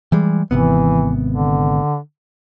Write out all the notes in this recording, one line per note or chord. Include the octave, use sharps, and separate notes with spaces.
E3 G3 G#3
G#1 C3 E3 B3
D3